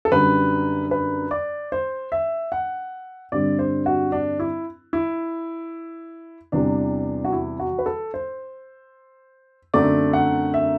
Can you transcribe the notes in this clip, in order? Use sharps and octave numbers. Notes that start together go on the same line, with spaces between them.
A4
F#2 D3 G3 B4
B4
D5
C5
E5
F#5
G2 D3 G3 C4 D5
C5
F#4
D4
E4
E4
E2 C3 E3 G3 D4
F#4
E4
F#4
B4
A4
C5
F#2 D3 A3 C4 D5
F#5
E5